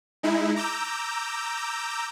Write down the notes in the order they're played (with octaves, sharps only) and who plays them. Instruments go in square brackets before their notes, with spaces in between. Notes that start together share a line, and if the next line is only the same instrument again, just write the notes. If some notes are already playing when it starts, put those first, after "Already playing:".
[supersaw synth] G#3 D#4 E4
A#5 D6 E6 G6